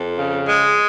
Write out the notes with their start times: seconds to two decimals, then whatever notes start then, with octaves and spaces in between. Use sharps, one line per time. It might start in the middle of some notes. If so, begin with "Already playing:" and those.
Already playing: F2
0.17 C#3
0.47 G#3